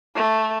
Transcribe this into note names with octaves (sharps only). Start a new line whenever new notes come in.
A3